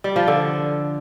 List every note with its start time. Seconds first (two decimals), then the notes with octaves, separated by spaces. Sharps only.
0.04 G3
0.16 F3
0.28 D3